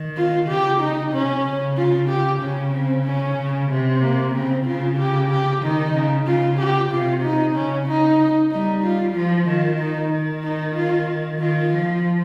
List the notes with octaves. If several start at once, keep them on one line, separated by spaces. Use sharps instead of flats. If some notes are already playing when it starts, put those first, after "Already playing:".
Already playing: D#3
F4
C#3 G4
D#4
C3 C#4
C#3
F4
G4
C#3 C#4
C4
C#4
C#3
C3
A#3
C#3 C4
C#3 F4
G4
G4
D#3 D#4
C#3
C#3 F4
G4
C3 F4
D#4
C#3 C#4
D#4
G3 D#4
F4
F3 F4
D#3 F4
D#4
D#3
D#4
F4
D#3 F4
F3